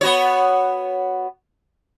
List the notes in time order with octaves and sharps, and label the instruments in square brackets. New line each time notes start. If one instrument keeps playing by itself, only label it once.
[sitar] B3 F#4 C#5